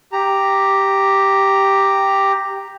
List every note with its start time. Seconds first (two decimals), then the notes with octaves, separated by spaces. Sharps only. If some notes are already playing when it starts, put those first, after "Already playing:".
0.13 G4 A#5